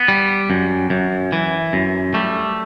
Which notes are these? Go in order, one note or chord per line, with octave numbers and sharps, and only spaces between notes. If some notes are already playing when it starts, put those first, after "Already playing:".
Already playing: B3
G3
F#2
F#2
E3
F#2
G3 A3